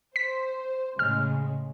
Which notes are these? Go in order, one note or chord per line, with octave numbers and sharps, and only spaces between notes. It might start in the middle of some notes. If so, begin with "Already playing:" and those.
C5 B6
A2 C#3 G#3 F6